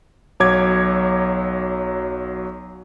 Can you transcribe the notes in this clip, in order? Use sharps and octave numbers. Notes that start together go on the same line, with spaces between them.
B1 F#3 C#5 D6 G#6